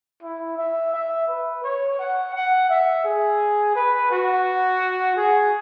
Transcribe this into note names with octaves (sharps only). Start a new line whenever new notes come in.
E4
E5
E5
B4
C#5
F#5
F#5
E5
G#4
B4
F#4
G#4